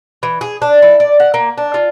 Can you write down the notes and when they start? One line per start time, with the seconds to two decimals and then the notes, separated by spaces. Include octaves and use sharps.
0.23 E3
0.41 G#4
0.62 D4
0.82 E4
1.00 D5
1.20 F#5
1.34 A#3
1.57 D4
1.74 F4